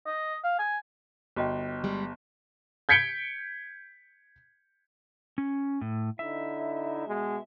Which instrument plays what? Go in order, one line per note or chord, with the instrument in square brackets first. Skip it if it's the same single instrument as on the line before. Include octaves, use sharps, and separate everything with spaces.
[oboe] D#5
F5
G#5
[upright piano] G1 [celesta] F#4 D#5 G5
[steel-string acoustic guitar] G3 G#3
[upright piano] G6 G#6 B6 C#7 D7 G7
[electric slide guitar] C#4
A2
[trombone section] D3 D#4 E4 [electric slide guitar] E5
[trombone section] B2 G#3